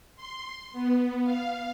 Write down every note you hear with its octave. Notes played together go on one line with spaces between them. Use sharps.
C6
B3
F5